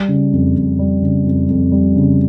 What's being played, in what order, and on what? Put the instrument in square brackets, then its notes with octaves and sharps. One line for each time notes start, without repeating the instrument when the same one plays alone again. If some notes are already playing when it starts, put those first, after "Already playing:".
Already playing: [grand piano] G3
C#3
F2
F2
G3
C#3
F2
F2
G3
C#3